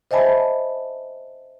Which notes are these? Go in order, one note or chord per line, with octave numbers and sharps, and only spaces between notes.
C5 D#5 E5 G#5 A5 B5